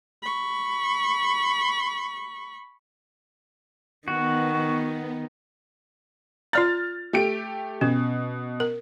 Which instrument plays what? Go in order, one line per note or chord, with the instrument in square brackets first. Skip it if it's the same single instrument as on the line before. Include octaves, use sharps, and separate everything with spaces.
[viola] B5 C#6
[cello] D#3 [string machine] B3 [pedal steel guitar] F#4
[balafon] F4 D5 A#5 [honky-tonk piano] F6 A6
[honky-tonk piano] A3 G4 D7
[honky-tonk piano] B2 [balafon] C#4
[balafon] A#4